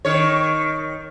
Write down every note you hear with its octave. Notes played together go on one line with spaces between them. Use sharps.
D#3 C#5